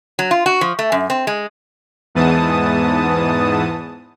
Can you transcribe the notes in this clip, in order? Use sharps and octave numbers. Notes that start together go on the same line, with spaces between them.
F#3
F4
F#4
F3
A3
F#2
C4
G#3
E2 G#2 E3 B3 A5 D#6